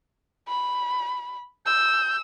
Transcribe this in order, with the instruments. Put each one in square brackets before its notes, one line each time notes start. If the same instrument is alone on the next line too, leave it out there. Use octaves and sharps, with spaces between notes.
[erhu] B5
[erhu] E6 [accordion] G6